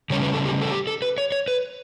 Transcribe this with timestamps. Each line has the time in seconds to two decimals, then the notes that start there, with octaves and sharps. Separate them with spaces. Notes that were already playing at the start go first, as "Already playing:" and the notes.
0.10 C#3 G3 C#4 C#5
0.23 B4
0.33 A4
0.46 G4
0.61 A4
0.72 G4
0.87 A4
1.02 B4
1.18 C#5
1.32 C#5
1.48 B4